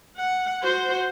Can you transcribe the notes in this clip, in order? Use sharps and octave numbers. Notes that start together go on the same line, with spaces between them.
F#5
F#4 C5